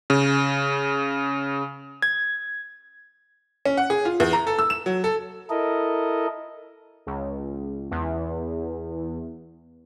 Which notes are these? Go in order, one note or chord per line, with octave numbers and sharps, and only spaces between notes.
C#3
G#6
C#4
F#5
G#4
F4
E2
A#5
A4
E6
E7
F#3
A4
E4 A4 A#4 D#5
C#2
E2